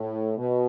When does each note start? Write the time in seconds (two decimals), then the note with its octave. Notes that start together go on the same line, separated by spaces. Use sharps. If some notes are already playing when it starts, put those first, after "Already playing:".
Already playing: A2
0.37 B2